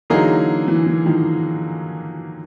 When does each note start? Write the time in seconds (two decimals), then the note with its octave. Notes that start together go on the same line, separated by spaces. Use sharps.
0.10 D3 E3 F#3 A#3 D#4 G#4
0.68 E3
0.86 E3
1.06 D#3 F3